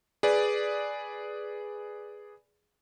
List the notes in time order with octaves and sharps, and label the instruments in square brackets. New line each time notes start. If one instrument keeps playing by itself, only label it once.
[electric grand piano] G#4 B4 D5